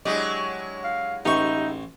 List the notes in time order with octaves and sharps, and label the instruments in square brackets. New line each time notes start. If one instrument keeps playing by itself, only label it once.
[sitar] F#3 G#3 E4 [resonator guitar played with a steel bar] D4 G4 D#5
[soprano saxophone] F5
[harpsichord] A1 C#6 [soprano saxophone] D#4 [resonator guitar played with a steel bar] G4 B4 E5